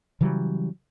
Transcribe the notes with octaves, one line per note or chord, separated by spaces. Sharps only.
C#3 E3 F#3 G3